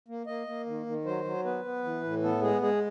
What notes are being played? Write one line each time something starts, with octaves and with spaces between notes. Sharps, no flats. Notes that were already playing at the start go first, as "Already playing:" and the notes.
A#3
A#3 D#5
A#3
D#3
D#3
F#3 C5
F#3
B3 B4
B3
E3
A2
B3 A4
G#3 G#4
G#3 G#4